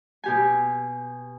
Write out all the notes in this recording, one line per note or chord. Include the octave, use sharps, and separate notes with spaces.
B2 G4 G#5